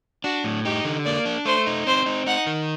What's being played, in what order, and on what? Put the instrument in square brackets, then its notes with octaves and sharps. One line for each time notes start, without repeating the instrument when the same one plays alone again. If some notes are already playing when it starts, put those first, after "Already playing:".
[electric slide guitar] D4 [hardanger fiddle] F#4
[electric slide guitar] A2
[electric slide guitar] D#4 [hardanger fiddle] G4
[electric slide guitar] D3
[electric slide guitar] A#3 [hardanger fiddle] D5
[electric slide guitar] D4
[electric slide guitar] A3 [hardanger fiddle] C5
[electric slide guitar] D#4
[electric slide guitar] C4 [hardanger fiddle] C5
[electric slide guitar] D#4
[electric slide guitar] D#4 [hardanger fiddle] F#5
[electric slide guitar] D#3